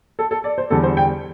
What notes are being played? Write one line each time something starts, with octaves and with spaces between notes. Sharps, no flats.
A4
A4
D5
C5
E2 D3 G3 A4
C5
G5